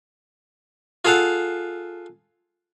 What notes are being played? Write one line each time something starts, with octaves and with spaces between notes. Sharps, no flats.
F4 G#4 A4 F5 F#5